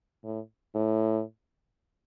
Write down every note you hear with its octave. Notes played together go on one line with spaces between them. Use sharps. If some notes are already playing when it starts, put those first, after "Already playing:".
A2
A2